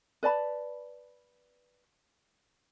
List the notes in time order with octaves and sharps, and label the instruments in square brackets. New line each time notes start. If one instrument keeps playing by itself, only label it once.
[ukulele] B4 D5 A5 B5